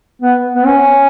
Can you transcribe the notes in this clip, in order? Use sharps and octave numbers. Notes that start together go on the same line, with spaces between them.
B3
B3
C#4